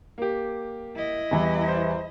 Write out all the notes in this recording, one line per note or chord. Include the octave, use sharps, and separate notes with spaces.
A#3 G4
E4 D#5
E2 E3 G3
C5